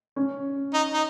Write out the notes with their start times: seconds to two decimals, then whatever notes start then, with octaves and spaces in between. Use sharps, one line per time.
0.16 C#4
0.74 D#4
0.93 D#4